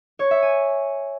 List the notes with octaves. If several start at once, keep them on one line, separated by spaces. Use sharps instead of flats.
C#5
E5
G#5